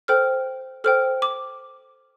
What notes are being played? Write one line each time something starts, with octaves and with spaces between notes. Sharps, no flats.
A4 C5 G5 F6
A4 C5 G5 F6
D6